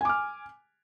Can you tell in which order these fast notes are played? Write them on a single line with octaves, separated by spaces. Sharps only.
G#5 D6 F6